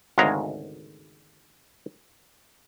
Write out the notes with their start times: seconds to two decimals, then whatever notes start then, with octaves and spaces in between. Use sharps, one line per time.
0.18 G#1 D2 C#3 G#3 A#5